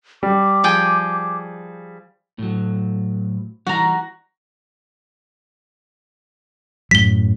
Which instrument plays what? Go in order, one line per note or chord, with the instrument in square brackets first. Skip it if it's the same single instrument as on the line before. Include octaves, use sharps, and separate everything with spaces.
[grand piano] G3 [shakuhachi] D6
[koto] F3 G#4 G5
[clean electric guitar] A2 F#3
[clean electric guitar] E3 G3 [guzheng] F#4 A#5
[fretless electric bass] F#2 A2 F#3 [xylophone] B6 G7